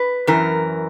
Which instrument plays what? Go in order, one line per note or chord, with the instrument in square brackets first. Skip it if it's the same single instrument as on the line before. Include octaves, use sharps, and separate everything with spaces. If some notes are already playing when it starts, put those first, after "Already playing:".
Already playing: [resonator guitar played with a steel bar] B4
F#2 E3 A#4